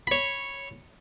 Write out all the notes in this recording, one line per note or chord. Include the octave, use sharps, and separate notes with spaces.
C#5 B5